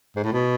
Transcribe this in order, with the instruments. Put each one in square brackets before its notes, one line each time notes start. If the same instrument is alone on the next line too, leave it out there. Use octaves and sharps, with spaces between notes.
[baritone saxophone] G#2
A2
B2